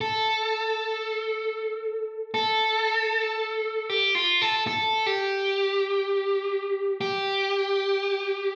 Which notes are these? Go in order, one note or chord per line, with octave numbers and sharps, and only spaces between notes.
A4
A4
G4
F4
A4
A4
G4
G4